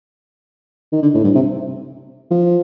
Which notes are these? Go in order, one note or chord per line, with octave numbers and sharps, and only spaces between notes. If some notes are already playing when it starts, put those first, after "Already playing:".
D#3
D3
A2
G2
C3
F3